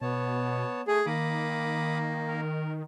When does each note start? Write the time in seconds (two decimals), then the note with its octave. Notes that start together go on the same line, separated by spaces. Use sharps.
0.01 B2 B3 C#5 A5
0.88 A3 G#4
1.06 D#3 A#3 B5 D6 D#6
2.28 A#4